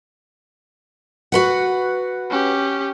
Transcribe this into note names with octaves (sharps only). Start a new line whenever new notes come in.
F#4 B4 F#5
C#4 G4